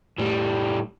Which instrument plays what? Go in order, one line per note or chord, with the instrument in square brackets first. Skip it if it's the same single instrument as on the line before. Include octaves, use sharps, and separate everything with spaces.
[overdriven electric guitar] A2 G3